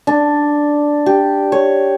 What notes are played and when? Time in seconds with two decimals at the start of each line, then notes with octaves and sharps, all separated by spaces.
0.07 D4
1.06 G4
1.52 C#5